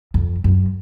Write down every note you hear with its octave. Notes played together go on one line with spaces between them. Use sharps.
F2
F#2